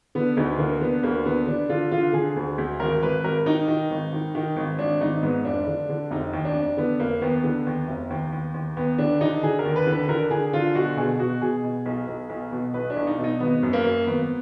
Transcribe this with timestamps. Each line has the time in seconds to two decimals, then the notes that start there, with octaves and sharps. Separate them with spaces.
0.15 D3 B3
0.37 D2 D#4
0.58 D3 A#3
0.81 D3 B3
1.03 D2 A#3
1.25 D3 B3
1.48 D3 D4
1.69 D3 F4
1.91 D3 F4
2.13 D3 G#4
2.36 D2
2.58 D2
2.80 G#1 A#4
3.02 G#1 B4
3.23 G#1 A#4
3.46 D#3 D#4
3.68 D#3
3.90 G#1
4.13 D#3
4.35 D#3
4.56 G#1
4.79 G#1 D4
5.01 G#1 D#4
5.23 G#2 B3
5.45 F1 D4
5.67 D3
5.89 D3
6.11 F1 D#4
6.33 D#2
6.45 D4
6.55 F1
6.77 D3 B3
7.00 F1 A#3
7.22 D#2 B3
7.44 D3
7.66 D#2
7.88 F1
8.10 D#2
8.32 D#2
8.54 D#2
8.77 D#2 B3
8.98 D3 D4
9.21 D3 D#4
9.43 D3 G#4
9.59 A#4
9.65 D#2
9.76 B4
9.87 D3
9.92 B4
10.08 D3 A#4
10.31 D3 G#4
10.53 D3 F4
10.75 B1 F#4
10.97 B2 G#4
11.19 B2 F#4
11.41 B2 G#4
11.63 B2
11.86 B1
12.07 B1
12.30 B1
12.51 B2
12.74 B1 B4
12.90 D4
12.96 B1
13.07 D#4
13.18 B2
13.24 D#4
13.40 G#1 B3
13.63 F#2
13.73 A#3
13.84 F#2
14.06 G#1 B3